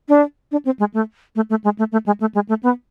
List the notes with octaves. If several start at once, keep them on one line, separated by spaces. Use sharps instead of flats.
D4
D4
C4
G#3
A3
A3
A3
G#3
A3
A3
G#3
A3
G#3
A3
B3